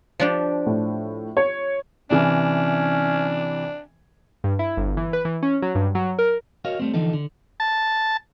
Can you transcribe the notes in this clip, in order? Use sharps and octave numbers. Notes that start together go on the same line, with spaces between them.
F3 D4 G4
A2
C#5
C3 E3 C#4 D4
G2
E4
G1
E3
B4
E3
C#4
F#3
G2
F#3
A#4
F#4 A#4 C#5 D#5 F5
G3 A3 C4
D3 E3 F3 D#4 A4
D3
A5